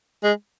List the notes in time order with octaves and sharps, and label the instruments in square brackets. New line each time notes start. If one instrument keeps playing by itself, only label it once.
[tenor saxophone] G#3